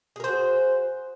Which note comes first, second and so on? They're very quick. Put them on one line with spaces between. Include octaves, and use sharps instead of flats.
G#4 A#4 C5 F#4